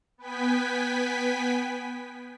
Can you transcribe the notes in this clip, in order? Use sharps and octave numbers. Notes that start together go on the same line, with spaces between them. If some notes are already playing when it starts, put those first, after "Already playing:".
B3 B4 G5 G#5 B6